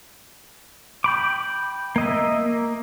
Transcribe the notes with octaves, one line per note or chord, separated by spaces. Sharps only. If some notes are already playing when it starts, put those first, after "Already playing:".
G5 B5 D6
A#3 D#5 E5
A#3